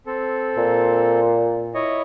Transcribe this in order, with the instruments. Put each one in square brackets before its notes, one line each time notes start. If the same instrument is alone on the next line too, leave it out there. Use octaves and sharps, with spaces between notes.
[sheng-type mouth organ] C4 A4
[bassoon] A#2
[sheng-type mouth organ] E4 C#5 D#5